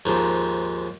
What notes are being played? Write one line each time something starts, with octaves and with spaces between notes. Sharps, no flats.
D#2 G#2 F3